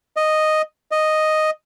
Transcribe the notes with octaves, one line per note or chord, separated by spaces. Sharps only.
D#5
D#5